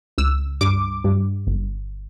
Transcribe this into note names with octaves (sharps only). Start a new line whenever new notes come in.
C#2 E6
G2 D6
G2
G1